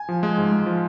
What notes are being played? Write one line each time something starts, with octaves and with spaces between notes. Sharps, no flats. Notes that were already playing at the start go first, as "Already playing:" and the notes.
Already playing: G#5
F3
G#3
G#2
G#3
F3